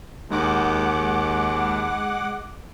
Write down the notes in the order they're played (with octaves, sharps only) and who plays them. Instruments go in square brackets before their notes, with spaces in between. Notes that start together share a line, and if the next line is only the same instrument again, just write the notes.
[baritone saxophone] D#2 [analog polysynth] G#3 F#5 D6